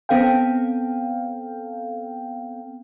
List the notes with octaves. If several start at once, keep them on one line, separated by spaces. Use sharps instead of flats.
B3 C4 A4 F5 G5